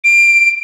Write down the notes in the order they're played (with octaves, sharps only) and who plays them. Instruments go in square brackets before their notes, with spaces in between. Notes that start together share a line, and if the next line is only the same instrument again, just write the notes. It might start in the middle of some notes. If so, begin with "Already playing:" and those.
[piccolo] D7